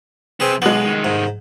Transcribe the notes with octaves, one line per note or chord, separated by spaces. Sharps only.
C3 C4 G#4 B4
B1 G#3 B3 F#7
C2 D#3
G#2